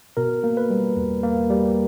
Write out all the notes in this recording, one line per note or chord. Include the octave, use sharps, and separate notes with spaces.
B2 A#4
A#3
B4
G3
E2
A#3
G3